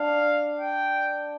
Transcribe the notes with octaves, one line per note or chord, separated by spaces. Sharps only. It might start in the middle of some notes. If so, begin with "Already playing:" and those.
Already playing: D4 F5
G5